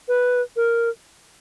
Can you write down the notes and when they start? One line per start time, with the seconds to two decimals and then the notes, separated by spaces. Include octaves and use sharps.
0.08 B4
0.56 A#4